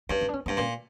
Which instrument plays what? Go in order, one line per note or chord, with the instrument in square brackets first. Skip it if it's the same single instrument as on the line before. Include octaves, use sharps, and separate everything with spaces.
[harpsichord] G2 [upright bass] C#4
[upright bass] C#4
D4
C#4
[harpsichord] G2 [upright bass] B3
[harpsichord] A#2 [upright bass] C#4